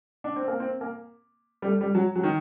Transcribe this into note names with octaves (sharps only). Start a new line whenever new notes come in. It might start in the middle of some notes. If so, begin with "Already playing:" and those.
D4
C4
A#3
C4
A#3
G3
A3
G3
F#3
F#3
D#3